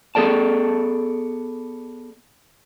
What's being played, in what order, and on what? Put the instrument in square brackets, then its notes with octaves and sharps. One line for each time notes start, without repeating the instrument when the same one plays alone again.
[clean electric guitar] B3 G#4 A4 D5 A5